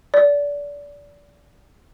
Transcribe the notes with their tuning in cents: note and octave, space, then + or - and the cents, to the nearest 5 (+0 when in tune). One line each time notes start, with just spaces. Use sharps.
D5 -25